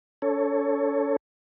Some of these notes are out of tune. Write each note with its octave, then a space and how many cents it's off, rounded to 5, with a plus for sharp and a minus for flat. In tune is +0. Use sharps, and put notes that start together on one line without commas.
C#4 +45 A4 +10 C#5 +0